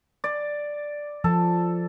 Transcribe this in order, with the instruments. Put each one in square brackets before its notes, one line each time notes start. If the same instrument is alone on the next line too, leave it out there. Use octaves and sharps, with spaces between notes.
[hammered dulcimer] D5
[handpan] F3 [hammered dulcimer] A4